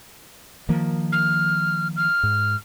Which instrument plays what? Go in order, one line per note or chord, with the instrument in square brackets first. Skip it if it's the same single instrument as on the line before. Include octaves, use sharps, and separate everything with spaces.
[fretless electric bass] D#3 F3 A#3
[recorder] F6
F6
[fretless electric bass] G#2